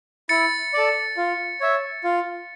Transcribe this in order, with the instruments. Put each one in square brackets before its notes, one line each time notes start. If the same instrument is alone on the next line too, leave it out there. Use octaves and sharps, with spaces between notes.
[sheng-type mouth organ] E4 [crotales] A6 C#7
[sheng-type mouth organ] A4 D5
F4
C#5 E5
F4